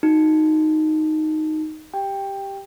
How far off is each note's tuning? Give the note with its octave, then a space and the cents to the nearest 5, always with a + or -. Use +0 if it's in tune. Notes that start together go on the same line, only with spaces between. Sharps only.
D#4 +0 F#4 -15
G4 +0 G5 +10